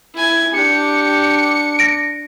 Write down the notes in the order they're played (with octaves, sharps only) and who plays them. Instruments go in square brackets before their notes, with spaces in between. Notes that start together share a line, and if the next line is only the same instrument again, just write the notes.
[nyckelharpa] E4 G#5
[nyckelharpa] D4 [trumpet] G4 [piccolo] C#7
[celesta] A#6 D7